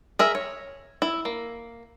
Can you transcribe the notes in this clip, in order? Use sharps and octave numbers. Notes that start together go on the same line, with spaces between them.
G#4 A#4 E5
C#5
E4
A#3